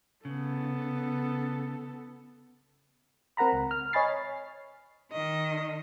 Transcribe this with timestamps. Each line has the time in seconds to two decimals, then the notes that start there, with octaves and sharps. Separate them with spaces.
0.25 C#3 B3 A4
3.37 C4 A#4 F#5 A#5 B5
3.53 C#2
3.71 F6
3.93 C#5 D#5 G#5 B5 A6 C7
5.12 D#3 D#5